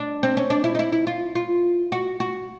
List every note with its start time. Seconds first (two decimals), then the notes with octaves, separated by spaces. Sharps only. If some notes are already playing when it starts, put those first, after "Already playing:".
Already playing: D4
0.23 C4
0.37 C#4
0.50 D4
0.64 E4
0.75 D#4
0.79 E4
0.92 E4
1.07 F4
1.35 F4
1.92 F#4
2.20 F#4